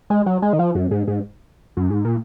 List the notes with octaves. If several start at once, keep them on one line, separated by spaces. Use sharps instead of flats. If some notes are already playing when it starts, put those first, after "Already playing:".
G#3
F#3
G#3
D#3
F3
F#2
G#2
G#2
F#2
G#2
A#2